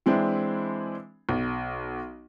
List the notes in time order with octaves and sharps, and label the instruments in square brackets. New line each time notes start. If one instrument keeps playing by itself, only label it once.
[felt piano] E3 G#3 C4 D4 E4
B1